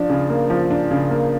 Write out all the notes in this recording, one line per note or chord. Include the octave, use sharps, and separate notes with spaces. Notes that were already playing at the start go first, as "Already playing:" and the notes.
Already playing: F3 D4
C#3
A#3
F3
D4
C#3
A#3